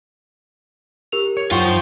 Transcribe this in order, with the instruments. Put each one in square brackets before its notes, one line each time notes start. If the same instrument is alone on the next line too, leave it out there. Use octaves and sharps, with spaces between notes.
[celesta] G4 A#4 F7
[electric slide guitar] C#5
[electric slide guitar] F#2 D#4 [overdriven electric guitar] F4 C5 [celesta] F#5 G5 C#6